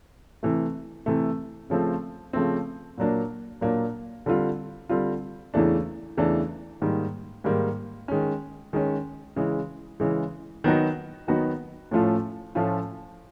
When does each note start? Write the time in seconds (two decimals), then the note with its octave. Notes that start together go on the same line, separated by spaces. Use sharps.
0.43 C3 E3 A3
1.06 C3 E3 A3
1.70 C#3 F3 A3 C4
2.33 C#3 F3 A3 C4
2.98 A#2 F#3 A#3 D4
3.61 A#2 F#3 A#3 D4
4.26 D3 G3 C4 F4
4.89 D3 G3 C4 F4
5.54 E2 C#3 E3 A3 D4
6.17 E2 C#3 E3 A3 D4
6.82 G#2 D#3 G3 A#3
7.44 G#2 D#3 G3 A#3
8.08 D#3 G#3 C#4
8.73 D#3 G#3 C#4
9.36 C#3 E3 G#3
10.00 C#3 E3 G#3
10.64 D#3 F#3 B3 D#4 F#4
11.28 D#3 F#3 B3 D#4 F#4
11.91 A2 F3 A3 C#4 F4
12.55 A2 F3 A3 C#4 F4